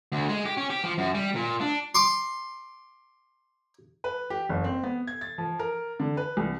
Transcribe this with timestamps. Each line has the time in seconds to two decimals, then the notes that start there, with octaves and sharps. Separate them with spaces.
0.12 D2
0.29 G#3
0.45 G4
0.57 C#4
0.70 G4
0.84 F3
0.98 F#2
1.15 G3
1.35 A#2
1.61 D4
1.95 C6 D6
4.04 B4
4.30 G4
4.49 F#1
4.64 C4
4.83 B3
5.07 G#6
5.21 A6
5.38 F3
5.59 A#4
6.00 D3
6.17 B4
6.37 C2